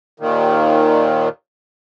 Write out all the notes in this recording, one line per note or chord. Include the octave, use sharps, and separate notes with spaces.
D#2 A#2 D#3